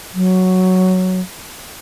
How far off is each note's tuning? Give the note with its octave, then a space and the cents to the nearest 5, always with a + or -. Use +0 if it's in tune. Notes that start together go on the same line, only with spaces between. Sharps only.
F#3 +0